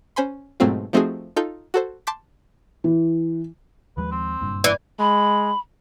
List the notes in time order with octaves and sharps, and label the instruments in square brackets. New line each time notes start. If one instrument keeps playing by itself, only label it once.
[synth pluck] C#4 C5 G#5 B5 C6
G#2 B2 F#3 A3 C4 F4
F3 A3 C4 D#4 F#4 G#4
D#4 F4 A4 G6
F#4 A4 C5
A5 C6 D6 G6 B6
[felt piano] E3
[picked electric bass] D#2 F3 G#3 [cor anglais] B4
[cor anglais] C4
[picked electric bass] F#1 G2 A#2
[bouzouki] E3 [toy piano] D5
[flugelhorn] G#3 [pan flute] B5